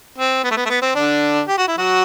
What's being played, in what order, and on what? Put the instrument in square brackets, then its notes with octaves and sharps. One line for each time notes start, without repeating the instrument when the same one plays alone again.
[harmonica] C4
B3
A3
B3
A3
B3
C4
D3 D4
G4
F#4
E4
F#3 F#4